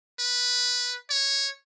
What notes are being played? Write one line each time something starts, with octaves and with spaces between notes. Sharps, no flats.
B4
C#5